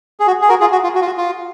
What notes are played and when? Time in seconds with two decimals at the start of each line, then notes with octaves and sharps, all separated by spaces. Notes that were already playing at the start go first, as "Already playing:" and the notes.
0.20 G#4
0.27 F#4
0.42 G#4
0.49 F#4 A#4
0.61 F4 G#4
0.72 F#4
0.83 F4
0.95 F#4
1.02 F4
1.06 F#4
1.17 F4